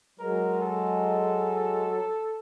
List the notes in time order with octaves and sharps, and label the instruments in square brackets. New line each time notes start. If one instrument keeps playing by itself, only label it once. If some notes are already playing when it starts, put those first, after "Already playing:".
[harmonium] F#3 G#3 [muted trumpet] A#4
[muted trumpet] A4